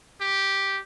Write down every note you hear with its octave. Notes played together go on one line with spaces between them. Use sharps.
G4